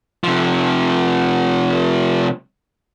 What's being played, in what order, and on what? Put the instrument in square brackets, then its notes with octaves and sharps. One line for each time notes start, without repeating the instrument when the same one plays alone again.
[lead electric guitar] C3 F3